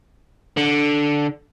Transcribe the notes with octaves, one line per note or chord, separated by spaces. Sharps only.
D3